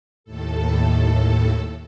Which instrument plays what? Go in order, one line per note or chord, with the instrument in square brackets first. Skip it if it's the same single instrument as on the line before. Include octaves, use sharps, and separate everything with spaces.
[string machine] D#2 A2 A4